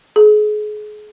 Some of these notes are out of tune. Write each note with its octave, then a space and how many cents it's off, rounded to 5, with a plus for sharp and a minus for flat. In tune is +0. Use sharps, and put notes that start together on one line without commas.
G#4 +35